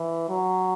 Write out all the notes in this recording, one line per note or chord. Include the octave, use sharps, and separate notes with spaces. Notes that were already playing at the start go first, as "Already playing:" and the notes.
Already playing: E3
F#3